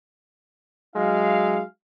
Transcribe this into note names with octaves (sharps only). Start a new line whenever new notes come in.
F#3 G#3 D#4 E5 F5